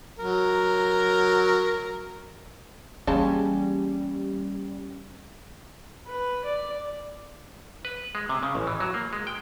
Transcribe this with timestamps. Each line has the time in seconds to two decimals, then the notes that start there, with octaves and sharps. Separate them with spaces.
0.19 F#3 A#4
3.07 C#3 E3 G3 G#3 A#3 C#4 A5
6.07 B4
6.45 D5
7.85 B4
8.15 G#3
8.29 C3
8.43 C#3
8.55 A1
8.67 E3
8.80 F#3
8.94 A#3
9.13 G#3
9.27 G5